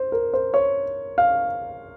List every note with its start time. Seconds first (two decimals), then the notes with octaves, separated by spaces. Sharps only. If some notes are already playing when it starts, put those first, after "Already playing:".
Already playing: C5
0.12 A#4
0.34 C5
0.54 C#5
1.18 F5